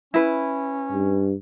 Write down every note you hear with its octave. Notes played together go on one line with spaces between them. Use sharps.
C#4 E4 B4
G2